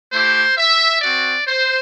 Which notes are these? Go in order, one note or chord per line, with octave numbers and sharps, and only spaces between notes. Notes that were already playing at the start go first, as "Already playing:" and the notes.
A3 E4 G4 C5
E5
C4 F#4 D5
C5